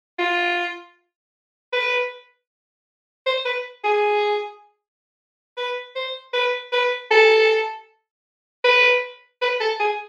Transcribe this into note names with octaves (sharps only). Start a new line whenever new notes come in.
F4
B4
C5
B4
G#4
B4
C5
B4
B4
A4
B4
B4
A4
G#4